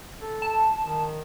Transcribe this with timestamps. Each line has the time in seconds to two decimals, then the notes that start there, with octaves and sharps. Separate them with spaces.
0.21 A4
0.42 A5
0.82 D#3